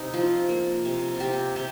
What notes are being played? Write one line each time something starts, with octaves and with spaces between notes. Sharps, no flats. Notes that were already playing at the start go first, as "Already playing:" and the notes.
Already playing: C3 D#4 G4
F3 F4
A#3
C3
F4
C3 G4
C3 G4